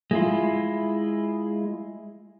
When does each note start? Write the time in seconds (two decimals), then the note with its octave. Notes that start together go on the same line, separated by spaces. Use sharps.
0.11 G#3 E4 F4